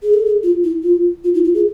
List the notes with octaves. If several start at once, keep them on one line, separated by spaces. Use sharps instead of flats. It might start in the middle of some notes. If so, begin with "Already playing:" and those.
G#4
A4
G#4
F4
E4
F4
F4
E4
F4
G#4